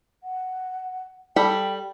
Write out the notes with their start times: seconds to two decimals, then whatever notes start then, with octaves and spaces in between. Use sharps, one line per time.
0.23 F#5
1.36 G3 A4 G5 B5